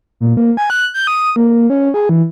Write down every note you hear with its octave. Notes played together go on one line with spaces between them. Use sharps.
A#2
A#3
G#5
F#6
G6
D#6
A#3
C#4
G#4
E3